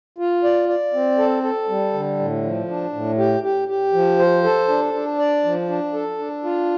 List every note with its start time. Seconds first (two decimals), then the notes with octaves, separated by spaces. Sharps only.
0.18 F4
0.44 D5
0.69 D5
0.93 C4
1.18 A4
1.43 A4
1.69 G3
1.93 D3
2.19 A2
2.43 F3
2.68 D4
2.93 A2
3.18 G4
3.43 G4
3.68 G4
3.93 F3
4.19 C5
4.43 A4
4.68 D4
4.94 D4
5.18 D5
5.44 F3
5.69 D4
5.93 A4
6.18 D4
6.44 F4